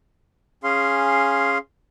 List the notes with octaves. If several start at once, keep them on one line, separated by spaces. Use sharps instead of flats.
C#4 G#4 F5 C6